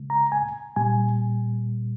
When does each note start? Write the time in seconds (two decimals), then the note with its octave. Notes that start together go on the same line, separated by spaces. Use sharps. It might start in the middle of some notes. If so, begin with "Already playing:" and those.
Already playing: C#3 G#3
0.10 A#5
0.32 G#5
0.76 A#2 G3 G#5